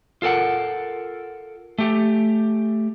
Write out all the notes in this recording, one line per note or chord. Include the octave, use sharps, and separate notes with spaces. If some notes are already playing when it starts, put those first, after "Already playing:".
F4 A4 A#4 F#5
A3 G4